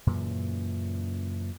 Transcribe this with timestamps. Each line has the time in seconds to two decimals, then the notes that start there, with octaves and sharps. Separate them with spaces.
0.07 F#2 A#2 C#3 E3